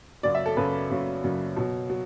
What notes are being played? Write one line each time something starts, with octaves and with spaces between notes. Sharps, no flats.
F#2 C#3 F#3 D5
E5
A4
F#2 C#3 F#3 B4
F#2 C#3 F#3
F#2 C#3 F#3
B2 F#3
F#3